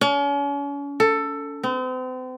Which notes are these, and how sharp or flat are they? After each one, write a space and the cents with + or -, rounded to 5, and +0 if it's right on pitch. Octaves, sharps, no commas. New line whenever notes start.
C#4 +40
A4 +15
C4 -40